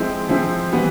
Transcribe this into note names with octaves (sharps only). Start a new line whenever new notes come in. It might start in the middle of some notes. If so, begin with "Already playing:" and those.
Already playing: F3 G#3 C4 E4
F3 G#3 C4 E4
E3 G3 B3